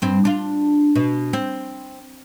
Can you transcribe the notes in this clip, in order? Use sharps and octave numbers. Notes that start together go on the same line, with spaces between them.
G2 C4
D4 F4
B2
C4